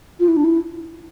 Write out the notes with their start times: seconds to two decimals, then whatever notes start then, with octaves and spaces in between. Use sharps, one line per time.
0.20 F4
0.28 E4
0.36 D4
0.44 E4